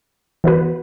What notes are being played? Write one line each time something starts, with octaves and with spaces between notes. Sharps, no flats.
E3 B3 F#4 B4